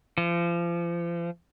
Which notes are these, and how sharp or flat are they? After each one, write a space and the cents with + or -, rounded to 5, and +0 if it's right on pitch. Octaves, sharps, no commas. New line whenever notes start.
F3 -35